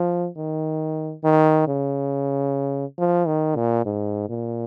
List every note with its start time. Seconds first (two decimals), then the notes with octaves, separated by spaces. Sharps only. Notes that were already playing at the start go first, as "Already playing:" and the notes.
Already playing: F3
0.36 D#3
1.24 D#3
1.67 C#3
2.98 F3
3.27 D#3
3.56 A#2
3.85 G#2
4.29 A#2